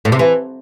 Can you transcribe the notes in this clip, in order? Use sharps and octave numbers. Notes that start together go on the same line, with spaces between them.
A2
C3
E3